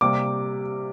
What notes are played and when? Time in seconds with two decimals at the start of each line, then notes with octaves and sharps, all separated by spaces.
0.01 C3 G3 A#3 D6